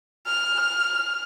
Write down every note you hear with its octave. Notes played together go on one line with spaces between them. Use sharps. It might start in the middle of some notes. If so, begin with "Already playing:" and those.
F6